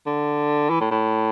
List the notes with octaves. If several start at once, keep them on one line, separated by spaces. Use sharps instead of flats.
D3
E3
A2
A2